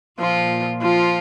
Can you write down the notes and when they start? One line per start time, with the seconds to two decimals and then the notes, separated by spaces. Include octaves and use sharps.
0.19 A#2 F3 F4
0.82 F3 F4